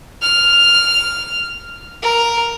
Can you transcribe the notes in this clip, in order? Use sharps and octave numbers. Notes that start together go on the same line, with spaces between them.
F6
A#4